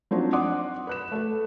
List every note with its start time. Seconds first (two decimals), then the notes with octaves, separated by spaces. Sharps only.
0.11 F3 F#3 C4 D4 D#4
0.33 D5 F#5 C6 D6 D#6
0.87 B4 F#6 E7
1.12 A3 A4